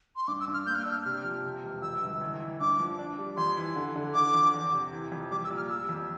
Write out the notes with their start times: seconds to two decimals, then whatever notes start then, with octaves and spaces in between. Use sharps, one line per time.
0.16 C6
0.28 G2 D6
0.40 E6
0.48 G2
0.54 F6
0.66 A#3 G6
0.75 F6
0.84 D4 E6
0.92 F6
1.05 C3 F6
1.24 F3
1.44 C3
1.63 E1
1.82 F2 E6
2.02 G1
2.21 A1
2.40 E3
2.60 G2 D6
2.80 F3
2.99 D4
3.18 G3
3.37 F2 C6
3.57 E3
3.76 D3
3.96 D3
4.14 D3 D6
4.34 F2
4.54 E2
4.72 C3
4.92 E3
5.12 F2
5.31 G3 D6
5.44 E6
5.50 A#2
5.57 F6
5.69 G3 E6
5.89 F2